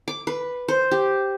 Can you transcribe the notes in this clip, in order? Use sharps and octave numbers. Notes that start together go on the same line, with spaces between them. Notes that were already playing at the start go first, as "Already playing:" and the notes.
D6
B4
C5
G4